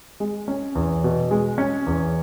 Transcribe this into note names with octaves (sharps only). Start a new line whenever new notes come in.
G#3
C#4
E2
B2
G#3
C#4
E2